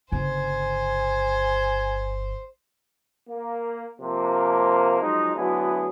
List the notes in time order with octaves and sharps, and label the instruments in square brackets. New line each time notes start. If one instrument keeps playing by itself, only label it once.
[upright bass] G1 C#3 [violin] C5 [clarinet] G#5
[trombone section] A#3
C3 F3 A#3
F3 F#3 G#3 D#4
D2 F#3 B3 E4 G#4